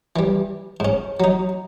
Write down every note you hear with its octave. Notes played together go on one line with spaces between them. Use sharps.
E3 G3
G#2 C#4
F#3 D#4